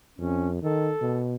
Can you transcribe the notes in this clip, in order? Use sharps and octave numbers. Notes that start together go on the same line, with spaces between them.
F2 C#4
D#3 A4
B2